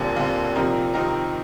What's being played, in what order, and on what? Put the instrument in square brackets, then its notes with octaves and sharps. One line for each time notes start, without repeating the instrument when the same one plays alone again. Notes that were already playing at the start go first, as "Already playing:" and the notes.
Already playing: [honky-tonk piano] D#2 D3 G3 C4 [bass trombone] A#2
[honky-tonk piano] D#2 D3 G3 C4
C3 F3 C4 D#4 A#4
[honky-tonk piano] C3 F3 C4 D#4 A#4 [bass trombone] D#3